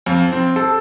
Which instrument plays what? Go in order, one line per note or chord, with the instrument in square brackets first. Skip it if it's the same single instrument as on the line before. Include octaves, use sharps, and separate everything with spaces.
[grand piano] F2
C4
A4